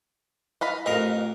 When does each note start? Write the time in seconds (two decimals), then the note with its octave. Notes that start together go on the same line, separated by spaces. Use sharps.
0.61 D#5 F5 B5
0.86 A1 F2 A#4 D#5